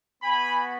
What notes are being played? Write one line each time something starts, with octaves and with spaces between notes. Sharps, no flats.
B3 F#4 G#5 B5